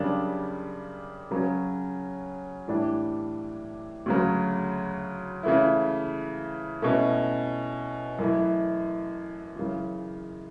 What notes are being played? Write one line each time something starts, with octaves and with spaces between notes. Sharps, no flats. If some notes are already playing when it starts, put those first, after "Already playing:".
Already playing: F#2 C#3 G3 D4
C#3 F#3 C#4
A2 E3 G3 D4
D2 C#3 F#3
C#3 E3 A3 E4
B2 A3 C#4 E4
F#2 E3 A3 E4
F#2 C#3 E3